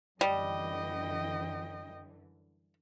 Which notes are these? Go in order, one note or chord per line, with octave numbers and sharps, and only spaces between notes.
F#2 D3 E3 G3 D#5 G5